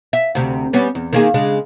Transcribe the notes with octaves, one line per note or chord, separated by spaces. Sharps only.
E5
D2 C3
G3 B3 C#4
E2
D#3 A#3 G#4
C#3 G#3 D4